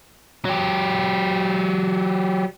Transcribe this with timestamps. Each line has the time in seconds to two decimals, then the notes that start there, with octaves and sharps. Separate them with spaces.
0.45 F#3 G4